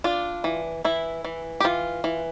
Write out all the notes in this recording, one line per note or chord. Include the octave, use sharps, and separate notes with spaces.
D4 F4
E3
E3 E4
E3
G4
E3 F4
E3